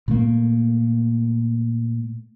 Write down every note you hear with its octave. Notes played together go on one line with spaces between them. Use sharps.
A#2 A3 A#3